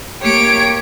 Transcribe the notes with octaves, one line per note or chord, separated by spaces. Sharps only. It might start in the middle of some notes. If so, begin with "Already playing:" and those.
A#3 G4 C#5 D7